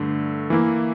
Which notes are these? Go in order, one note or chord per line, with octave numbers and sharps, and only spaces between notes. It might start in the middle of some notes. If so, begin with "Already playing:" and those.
Already playing: G2 D3 A3 D4
E3 A#3 E4